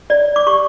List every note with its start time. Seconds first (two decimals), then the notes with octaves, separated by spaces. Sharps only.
0.10 C#5 D5
0.36 D6
0.46 G4 C#6